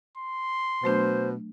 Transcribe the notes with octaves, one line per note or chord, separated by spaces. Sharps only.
C6
B2 F#3 A3 D4 C5